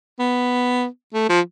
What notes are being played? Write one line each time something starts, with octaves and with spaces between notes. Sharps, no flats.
B3
A3
F3